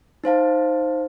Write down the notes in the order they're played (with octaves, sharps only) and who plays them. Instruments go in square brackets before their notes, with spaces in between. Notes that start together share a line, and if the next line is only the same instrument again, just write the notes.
[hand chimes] D#4 C5 F5 A5